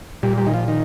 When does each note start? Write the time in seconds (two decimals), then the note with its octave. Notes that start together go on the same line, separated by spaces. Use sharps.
0.23 A#2 G3
0.38 G3
0.46 D#3
0.54 F3
0.68 D#3